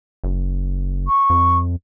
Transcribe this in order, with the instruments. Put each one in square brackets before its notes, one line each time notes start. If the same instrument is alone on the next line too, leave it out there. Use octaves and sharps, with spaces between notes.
[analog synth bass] F#1
[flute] C#6
[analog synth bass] F2